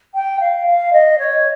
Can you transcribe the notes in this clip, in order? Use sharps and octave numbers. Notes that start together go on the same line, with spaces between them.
G5
F5
F5
D#5
C#5